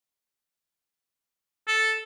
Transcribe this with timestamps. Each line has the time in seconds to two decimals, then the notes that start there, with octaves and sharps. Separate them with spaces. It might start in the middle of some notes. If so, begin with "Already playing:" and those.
1.68 A4